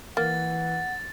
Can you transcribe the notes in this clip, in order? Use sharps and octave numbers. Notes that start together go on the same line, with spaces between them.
E3 A#3 F#5 A6